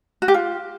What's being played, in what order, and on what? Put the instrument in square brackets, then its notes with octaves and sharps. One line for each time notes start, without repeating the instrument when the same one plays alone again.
[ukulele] F#4
G4
F4